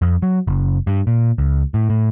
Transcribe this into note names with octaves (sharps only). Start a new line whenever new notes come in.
F2
F#3
F#1
G2
A#2
C#2
A2
A2